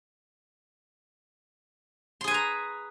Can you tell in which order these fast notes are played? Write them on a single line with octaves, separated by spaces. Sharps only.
C6 G#4 G#5 B4 A#5